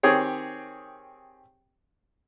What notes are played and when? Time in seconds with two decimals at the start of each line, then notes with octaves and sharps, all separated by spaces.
0.03 D#3 C4 G4 G#4 C#5